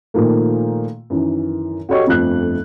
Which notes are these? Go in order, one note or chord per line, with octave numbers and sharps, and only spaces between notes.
A#2 D#3 F3 A3 A#3
F#2 D#3 E3
F#4 G4 A4 C#5 D#5 C#6
G1 F2 F3 A3 F#6